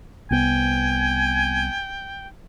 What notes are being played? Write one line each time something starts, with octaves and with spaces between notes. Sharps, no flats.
C2 B3 G5 G#5